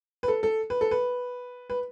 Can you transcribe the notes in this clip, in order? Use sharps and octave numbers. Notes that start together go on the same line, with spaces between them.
B4
A4
A4
B4
A4
B4
B4